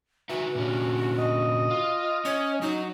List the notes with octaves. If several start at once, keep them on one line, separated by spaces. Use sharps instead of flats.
D#4 F#4 B4 E5
A#2 D3 C#4
D#5
F4
C#4 C#5
F#3 D#4